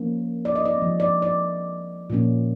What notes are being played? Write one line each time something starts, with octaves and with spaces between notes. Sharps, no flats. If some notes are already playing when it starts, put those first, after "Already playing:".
Already playing: F3 A#3 C#4
D5
D#5
D5
F3 G#3 C4
D5
D5
A#2 F3 A#3 C#4